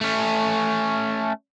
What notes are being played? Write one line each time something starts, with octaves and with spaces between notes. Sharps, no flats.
A3 C#4